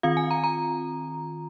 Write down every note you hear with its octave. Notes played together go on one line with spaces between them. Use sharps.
D#3 C4 F4 F5
G#5
A#5
A#5